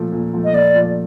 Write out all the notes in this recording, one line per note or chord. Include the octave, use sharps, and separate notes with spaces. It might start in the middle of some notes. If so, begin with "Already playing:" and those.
Already playing: A#2 F3 A3
A#2
F3 A3
D#5
A#2 D5
F3 A3